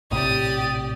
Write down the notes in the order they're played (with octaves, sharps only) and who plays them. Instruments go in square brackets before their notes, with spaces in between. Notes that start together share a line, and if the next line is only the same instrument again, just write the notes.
[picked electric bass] A#1 A2 C3 [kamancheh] G4 D5 [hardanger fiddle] D#6